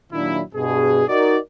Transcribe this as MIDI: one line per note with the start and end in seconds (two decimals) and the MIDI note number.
0.12 0.40 46
0.12 0.40 51
0.12 0.40 54
0.12 0.40 58
0.12 0.40 62
0.12 0.40 64
0.55 1.03 43
0.55 1.03 47
0.55 1.03 68
1.08 1.37 63
1.08 1.37 66
1.08 1.37 70
1.08 1.37 74